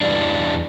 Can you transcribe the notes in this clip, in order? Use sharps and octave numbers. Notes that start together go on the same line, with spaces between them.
E2 E3 G3 D4